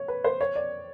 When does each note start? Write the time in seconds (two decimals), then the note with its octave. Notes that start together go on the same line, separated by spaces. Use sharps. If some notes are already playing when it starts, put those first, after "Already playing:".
Already playing: C#5
0.08 B4
0.24 C5
0.41 C#5
0.56 D5